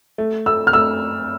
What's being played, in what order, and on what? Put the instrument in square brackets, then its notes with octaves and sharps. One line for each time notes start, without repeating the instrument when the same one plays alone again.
[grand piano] A3
[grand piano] A3 [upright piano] E6
[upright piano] F6
[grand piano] A3 [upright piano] E6